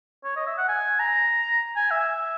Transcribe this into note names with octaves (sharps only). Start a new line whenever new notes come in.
C#5
D#5
E5
F#5
G#5
A#5
G#5
E5